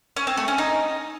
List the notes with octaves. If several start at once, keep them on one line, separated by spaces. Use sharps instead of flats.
C#4
C4
A3
C#4
D#4